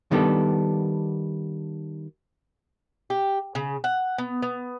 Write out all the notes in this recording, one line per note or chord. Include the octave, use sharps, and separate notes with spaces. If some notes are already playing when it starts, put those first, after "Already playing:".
D#3 G3 B3 D4 A4
G4
C#3
F#5
B3
B3